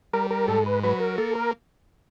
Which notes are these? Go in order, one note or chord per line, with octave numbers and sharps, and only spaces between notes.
G3 A#4
A#4
G#2 A4
B4
F#3 B4
A#4
A#3 A4
A#4